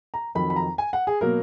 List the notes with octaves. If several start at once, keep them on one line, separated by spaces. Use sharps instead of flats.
A#5
F2 D#3 F#3 B5
B5
A#5
G#5
F#5
G#4
B2 F#3 A#3 A#4